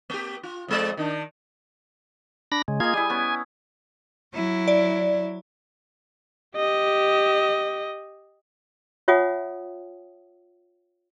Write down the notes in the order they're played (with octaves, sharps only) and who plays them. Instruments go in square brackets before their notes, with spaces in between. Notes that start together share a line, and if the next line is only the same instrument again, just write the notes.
[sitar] A#3 G4
F4
F2 G#3 D5
D#3 D4
[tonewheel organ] D4 B5 A#6
C#3 G#3
[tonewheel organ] A#3 F4 G#6 [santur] G#4 D#5
[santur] G3 E4 [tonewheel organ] G#5
[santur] B3 C#4
[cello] F#3 E4
[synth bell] D5
[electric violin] G4 D#5
[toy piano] F4 C#5 E5 F#5 G#5 D#6